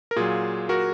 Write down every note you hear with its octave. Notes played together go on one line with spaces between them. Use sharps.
A#4
A#2 F#3 F4 G#4
F#4 A#4